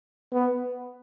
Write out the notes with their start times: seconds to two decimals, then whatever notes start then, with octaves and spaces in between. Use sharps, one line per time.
0.33 B3